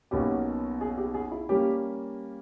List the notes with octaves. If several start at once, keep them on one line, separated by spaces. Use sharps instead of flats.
B1 B2 A#3 C#4 G4
G#4
G4
G#4
E4
G3 A#3 C#4 G4